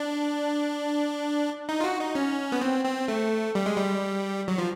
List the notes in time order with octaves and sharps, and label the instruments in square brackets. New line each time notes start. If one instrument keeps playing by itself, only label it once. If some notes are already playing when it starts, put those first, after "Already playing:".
Already playing: [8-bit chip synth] D4
D#4
F4
F#4
D#4
C#4
B3
C4
C4
A3
G3
G#3
G3
F#3
F3